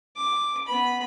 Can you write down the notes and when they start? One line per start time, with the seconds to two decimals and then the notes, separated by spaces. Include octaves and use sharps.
0.16 D6
0.67 B3 B5